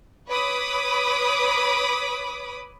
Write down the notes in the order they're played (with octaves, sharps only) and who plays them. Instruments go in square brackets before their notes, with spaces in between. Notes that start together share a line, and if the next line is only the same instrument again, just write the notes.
[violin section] B4 C#5 B5 D6 D#6